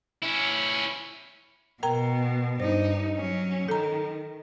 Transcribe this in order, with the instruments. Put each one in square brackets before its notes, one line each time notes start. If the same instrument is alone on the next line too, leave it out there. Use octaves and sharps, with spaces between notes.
[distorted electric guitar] C#4 E4
[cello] B2 [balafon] A#4 G5 A#5
[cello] G2 D#4 [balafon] C5
[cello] F#3 C#4
[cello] D#3 [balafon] A4 A#5